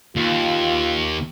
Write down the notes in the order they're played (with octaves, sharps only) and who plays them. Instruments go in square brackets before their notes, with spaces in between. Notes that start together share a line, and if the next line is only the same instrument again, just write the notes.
[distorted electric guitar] D#2 [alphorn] F4